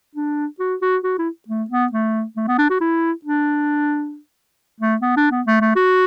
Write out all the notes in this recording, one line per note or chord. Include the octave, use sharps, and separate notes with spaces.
D4
F#4
F#4
F#4
E4
A3
B3
A3
A3
B3
D4
F#4
E4
D4
A3
B3
D4
B3
A3
A3
F#4